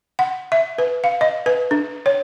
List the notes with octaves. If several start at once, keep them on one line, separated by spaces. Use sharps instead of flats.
F#5
E5
B4
F5
D#5
B4
D4
C#5